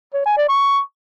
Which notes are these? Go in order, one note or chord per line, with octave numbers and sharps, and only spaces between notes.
C#5
G#5
D5
C#6